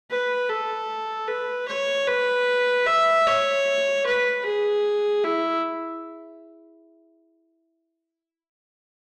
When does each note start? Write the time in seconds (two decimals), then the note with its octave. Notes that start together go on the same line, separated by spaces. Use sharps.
0.11 B4
0.49 A4
1.28 B4
1.68 C#5
2.08 B4
2.86 E5
3.26 C#5
4.06 B4
4.45 G#4
5.24 E4